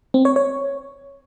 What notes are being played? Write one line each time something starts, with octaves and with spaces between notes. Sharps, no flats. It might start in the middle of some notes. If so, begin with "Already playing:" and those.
C4
C#5
C#5